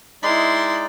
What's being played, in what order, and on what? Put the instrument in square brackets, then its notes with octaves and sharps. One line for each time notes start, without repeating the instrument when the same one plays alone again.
[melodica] G#3 D#4 D5 [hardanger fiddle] E4 C6